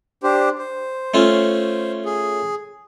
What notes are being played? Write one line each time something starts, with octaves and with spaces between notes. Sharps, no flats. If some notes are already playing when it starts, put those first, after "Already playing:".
D4 G4 C5
C5
A3 C#4 F4
G#4